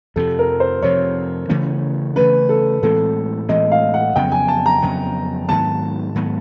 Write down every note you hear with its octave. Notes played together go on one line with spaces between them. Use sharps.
F2 C3 F3 A4
A#4
C5
F2 C3 F3 C#5
C#3 E3 A3 C#4
C#3 E3 A3 C#4 B4
A4
A2 E3 G#3 C4 A4
A2 E3 G#3 C4 D#5
F5
F#5
F2 C#3 F#3 B3 G5
G#5
A5
A#5
F2 C#3 F#3 B3
G#2 D#3 F#3 B3 A5
G#2 D#3 F#3 B3